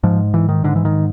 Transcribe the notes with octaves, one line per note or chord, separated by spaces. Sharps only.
G#2 F3
E3
D#3
G#2 D3
E3
D#3